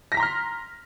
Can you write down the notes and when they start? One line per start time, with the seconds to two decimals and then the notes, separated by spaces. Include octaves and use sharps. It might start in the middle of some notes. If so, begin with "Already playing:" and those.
0.12 A#6
0.14 B6
0.17 A#5
0.20 C6
0.23 F6